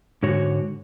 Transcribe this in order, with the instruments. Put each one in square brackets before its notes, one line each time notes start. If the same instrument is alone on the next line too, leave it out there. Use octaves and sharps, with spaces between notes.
[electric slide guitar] G#2 D3 F#4 C#5